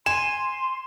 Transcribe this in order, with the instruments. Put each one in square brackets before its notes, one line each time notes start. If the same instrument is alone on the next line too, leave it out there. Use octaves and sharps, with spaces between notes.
[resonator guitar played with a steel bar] G#5 [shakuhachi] C6 [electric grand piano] E7